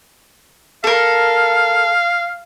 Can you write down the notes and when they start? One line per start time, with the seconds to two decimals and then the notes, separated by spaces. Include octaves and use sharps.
0.84 A4 A#4 F5